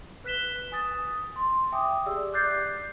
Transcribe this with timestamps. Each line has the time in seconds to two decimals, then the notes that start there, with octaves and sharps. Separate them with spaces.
0.24 B4 F#6 B6 E7 G7
0.72 G#5 D#6 A6
1.36 C6
1.72 E5 G5 G#5 D6 D#6
2.06 G4 G#4 D5 E6
2.33 D5 D6 F#6 G6 A6 C7